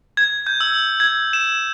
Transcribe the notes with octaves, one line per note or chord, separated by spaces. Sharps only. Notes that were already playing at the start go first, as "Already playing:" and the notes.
G#6
G6
E6
G#6
E7